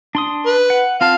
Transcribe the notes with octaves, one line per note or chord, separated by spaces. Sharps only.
D4 C6 D#6
B4
F#5
C4 F4 F5 A5